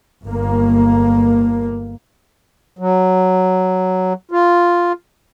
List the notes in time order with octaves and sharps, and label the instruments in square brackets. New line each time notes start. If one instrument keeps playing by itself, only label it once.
[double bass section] G1 A#3
[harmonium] F#3
F4